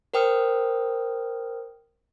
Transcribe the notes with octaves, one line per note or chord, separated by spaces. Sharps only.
A#4 C5 G5 D#6 F6